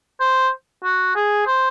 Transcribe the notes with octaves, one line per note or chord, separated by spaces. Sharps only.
C5
F#4
G#4
C5